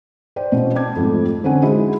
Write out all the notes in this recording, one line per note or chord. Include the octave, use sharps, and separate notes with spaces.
C5 D5 G5
B2 C4 C#4 E4
G5 A5 D6 G#6
F2 G#2 F3 A3
D3 C4 C#4 F#5 G#5
G#3 D#4 E4 F#4 G#4